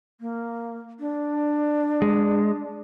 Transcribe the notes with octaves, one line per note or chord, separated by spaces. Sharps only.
A#3
D4
G#3